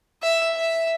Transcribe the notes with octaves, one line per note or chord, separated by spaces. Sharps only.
E5
E5